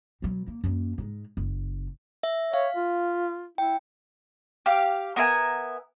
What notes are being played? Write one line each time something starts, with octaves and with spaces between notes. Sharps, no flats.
B2 F#3
A#3
F#2 A#3
G#2 G#3
F#1
E5
C#5 F5
F4
E4 G5
G4 F5
B3 A#4 E5 G#5